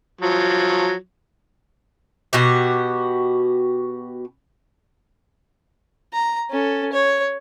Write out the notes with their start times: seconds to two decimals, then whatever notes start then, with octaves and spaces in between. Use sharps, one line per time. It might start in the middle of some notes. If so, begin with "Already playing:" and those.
0.21 F3 F#3
2.33 B2 F#4 G4
6.13 A#5
6.50 C#4 A4
6.93 C#5